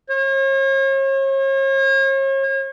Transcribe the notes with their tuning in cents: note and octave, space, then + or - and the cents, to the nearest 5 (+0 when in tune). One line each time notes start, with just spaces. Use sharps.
C#5 -40